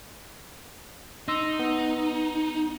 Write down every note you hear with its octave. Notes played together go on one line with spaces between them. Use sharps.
D#4 C6 E6 A#6
B3